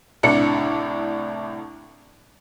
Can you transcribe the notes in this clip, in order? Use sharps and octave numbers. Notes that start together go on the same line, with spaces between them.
C2 A2 D4 C#7